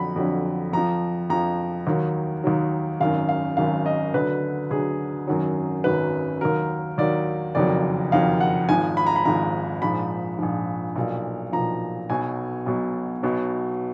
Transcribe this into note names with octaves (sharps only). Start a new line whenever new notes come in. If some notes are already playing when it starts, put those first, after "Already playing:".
Already playing: F2 D3 F#3 B5
F2 D3 F#3
F2 F3 A#5
F2 F3 A#5
D#2 D#3 F#3
D#2 D#3 F#3
G#1 F#2 D#3 F5
F5
G#1 F#2 D#3 F5
D#5
D2 D3 F#3 B4
D2 D3 F#3 G#4
G#1 F#2 D#3 F#3
G#1 F#2 D#3 F#3 B4
D#2 D#3 F#3 A#4
D#2 D#3 F#3 D5
F#1 F2 D#3 F#3 D5
F#1 F2 D#3 F#3 F5
F#5
G#1 G#2 F3 G#5
B5
A#5
B5
G#1 G#2 F3 A#5
A#1 G#2 F3 B5
A#1 G#2 F3
B1 A#2 F3
B1 A#2 F3 A#5
B1 B2 F#3 G#5
B1 B2 F#3
B1 B2 F#3